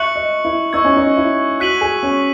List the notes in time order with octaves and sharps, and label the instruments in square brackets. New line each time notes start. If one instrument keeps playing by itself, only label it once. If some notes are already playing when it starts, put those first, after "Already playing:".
Already playing: [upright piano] E5 [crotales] C#6 F#6 C#7 F#7
[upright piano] D#5
E4
[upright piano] D#4 [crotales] C#6 E6 G#6
[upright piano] C#4
D#4
E4
[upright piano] F#4 [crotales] F#6 B6 D#7 F#7
[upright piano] G#4
C#4